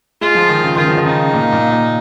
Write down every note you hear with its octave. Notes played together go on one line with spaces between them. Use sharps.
G#3 F4
F3
D#3
C#3
D#3 F4
F3
D#3
C#3 D#4
A#2
A#2
A#2